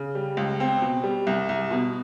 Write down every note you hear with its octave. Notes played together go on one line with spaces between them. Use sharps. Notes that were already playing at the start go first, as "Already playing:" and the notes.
Already playing: C#3
G3
C#2
C4
B2
G3
C2
C2
B2